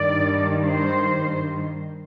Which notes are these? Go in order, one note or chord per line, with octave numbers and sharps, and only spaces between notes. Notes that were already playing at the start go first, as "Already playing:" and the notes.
Already playing: G2 D#3 G3 D5
C5